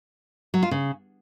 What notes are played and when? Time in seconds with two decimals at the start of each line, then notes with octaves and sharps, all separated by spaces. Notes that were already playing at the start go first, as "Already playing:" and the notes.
0.54 F#3
0.63 F4
0.71 C#3